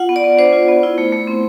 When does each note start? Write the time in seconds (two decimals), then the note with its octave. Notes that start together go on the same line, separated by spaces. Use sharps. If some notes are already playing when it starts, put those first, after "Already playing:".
Already playing: F4 F#5
0.09 B3
0.16 D5
0.24 B3
0.38 D4 C5
0.53 F4
0.68 B3
0.83 E4
0.98 A3
1.13 A3
1.27 C4